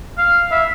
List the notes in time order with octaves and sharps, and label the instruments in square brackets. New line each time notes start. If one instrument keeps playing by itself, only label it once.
[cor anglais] F5
E5